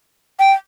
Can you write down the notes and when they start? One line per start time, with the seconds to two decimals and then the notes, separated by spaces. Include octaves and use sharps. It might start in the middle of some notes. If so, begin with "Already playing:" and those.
0.39 G5